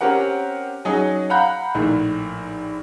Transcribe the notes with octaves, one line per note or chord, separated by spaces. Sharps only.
C4 C#4 G4 A#4 F#5
F#3 C#4 D#4 G#4 D#5
F5 F#5 A#5 B5 F#6 G6
A#1 A2 D#3